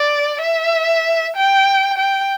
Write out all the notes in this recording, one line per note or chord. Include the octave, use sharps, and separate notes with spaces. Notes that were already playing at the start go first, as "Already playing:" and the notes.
Already playing: D5
E5
G5
G5